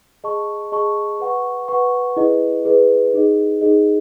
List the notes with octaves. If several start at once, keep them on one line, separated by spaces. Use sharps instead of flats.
G#4 D#5 A5 C#6
G#4 D#5 A5 C#6
B4 F#5 C#6
B4 F#5 C#6
E4 G#4 B4 D#5
E4 G#4 B4 D#5
D#4 G#4 D#5
D#4 G#4 D#5